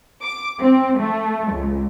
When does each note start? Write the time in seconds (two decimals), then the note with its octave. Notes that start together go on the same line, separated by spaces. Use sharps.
0.23 D6
0.60 C4
0.99 A3
1.53 C#2